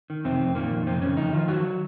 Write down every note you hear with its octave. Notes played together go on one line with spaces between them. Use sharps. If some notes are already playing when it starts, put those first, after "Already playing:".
D#3
F2 C3 C4
F2
A#2 D#3 A#3
F2
F2 C3 C4
F2 C#3 C#4
F2 D#3 D#4
D#3 F3 F4
D#3 F#3 F#4